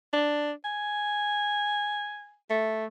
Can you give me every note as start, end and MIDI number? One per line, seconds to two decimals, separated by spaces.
0.13 0.52 62
0.65 2.35 80
2.50 2.86 57